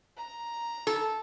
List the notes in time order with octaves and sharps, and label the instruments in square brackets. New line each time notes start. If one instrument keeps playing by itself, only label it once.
[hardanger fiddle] A#5
[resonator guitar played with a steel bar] A4